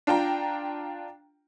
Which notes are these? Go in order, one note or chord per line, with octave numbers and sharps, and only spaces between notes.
D4 F4 G5 A#5